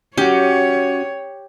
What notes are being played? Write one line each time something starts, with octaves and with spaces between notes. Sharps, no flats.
C#4 F#4 G4 C#5